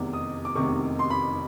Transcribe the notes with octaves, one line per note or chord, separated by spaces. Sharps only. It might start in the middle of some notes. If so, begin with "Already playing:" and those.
Already playing: F1 E2 C3 D#3 D6
D#6
D6
F1 E2 C3 D#3 C#6
C6
B5